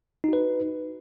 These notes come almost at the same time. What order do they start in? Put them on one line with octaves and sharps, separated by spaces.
D#4 F#4 B4